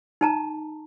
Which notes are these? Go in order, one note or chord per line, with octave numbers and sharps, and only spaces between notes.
D#4 A5 A#5